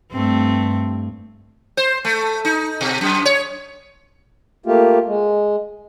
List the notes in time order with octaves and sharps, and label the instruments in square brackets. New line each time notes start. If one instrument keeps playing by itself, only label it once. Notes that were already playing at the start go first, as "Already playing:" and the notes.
[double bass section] G2 [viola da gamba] A3 C4
[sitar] C5
A3
D#4
B2
F#2
C#5
[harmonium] A3 A#3 F4 G4
G#3